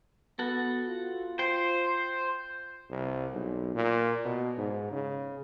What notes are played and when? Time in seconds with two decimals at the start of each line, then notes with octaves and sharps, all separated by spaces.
0.39 B3 F#4 A4
0.89 F4
1.39 C5 G5 C6
2.90 C2
3.33 B1
3.75 A#2
4.25 B2
4.58 G#2
4.92 C#3